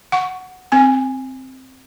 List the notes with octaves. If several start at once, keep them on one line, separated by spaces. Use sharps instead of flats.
F#5 C#6
C4 G#5